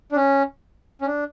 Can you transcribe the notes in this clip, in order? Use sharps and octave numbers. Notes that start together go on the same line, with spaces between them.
D4
C#4
C#4
D4